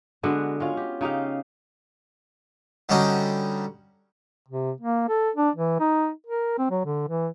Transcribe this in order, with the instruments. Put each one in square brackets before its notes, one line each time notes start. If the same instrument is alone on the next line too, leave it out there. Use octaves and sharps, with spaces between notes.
[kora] D3 G#3 B3 F#4
G#3 C#4 F4
G4
C#3 D#4 G4 F5
[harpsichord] D3 G3 C#4 D#4 F#4
[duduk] C3
A#3
A4
D4
E3
D#4
A#4
C4
F#3
D3
E3